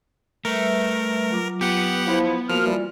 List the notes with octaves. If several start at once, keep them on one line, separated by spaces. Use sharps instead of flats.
G3 A3 A#4 B4 E5
F#3 F4 D6
B3 G4 F#5
F3 E4
F3 A#3 F#4 A#4 F6
E3 G3 F4